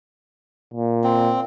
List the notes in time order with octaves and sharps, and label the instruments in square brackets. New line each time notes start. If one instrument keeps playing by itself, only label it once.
[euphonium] A#2
[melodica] C4